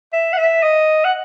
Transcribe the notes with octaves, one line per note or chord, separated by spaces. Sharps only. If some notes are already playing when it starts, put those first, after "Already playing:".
E5
F#5
E5
D#5
F#5